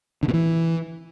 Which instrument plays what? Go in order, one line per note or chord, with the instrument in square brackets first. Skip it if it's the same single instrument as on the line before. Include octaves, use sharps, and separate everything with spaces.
[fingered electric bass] D3
B2
E3